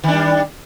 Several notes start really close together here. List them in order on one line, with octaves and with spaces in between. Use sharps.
D#3 D4 G3